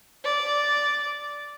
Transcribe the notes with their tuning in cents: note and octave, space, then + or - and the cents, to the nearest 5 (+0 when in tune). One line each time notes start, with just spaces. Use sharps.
D5 -5